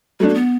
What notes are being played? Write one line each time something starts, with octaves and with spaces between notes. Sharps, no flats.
F#3 G3 A3 D4
A#3
B3